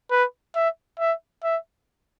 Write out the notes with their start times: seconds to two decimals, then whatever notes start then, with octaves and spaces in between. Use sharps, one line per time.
0.10 B4
0.55 E5
0.99 E5
1.43 E5